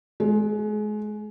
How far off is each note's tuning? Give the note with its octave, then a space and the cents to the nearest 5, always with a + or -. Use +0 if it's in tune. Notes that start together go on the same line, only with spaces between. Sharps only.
G#3 +30